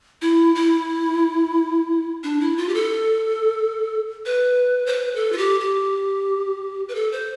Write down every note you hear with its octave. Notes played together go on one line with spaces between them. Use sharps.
E4
E4
D4
E4
F4
G4
A4
B4
C5
B4
A4
F4
G4
G4
B4
A4
C5